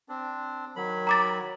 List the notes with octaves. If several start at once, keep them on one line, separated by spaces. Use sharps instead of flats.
C4 D4
D#3 F#3 B5
A#5 D6 A6